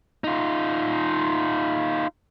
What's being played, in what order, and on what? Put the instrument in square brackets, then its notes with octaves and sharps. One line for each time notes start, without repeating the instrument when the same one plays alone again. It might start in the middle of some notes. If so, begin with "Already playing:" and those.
[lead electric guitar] D#4 F4